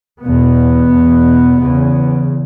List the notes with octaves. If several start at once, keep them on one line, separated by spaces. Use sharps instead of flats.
E2 B2 B3
E2 B2
E2 C#3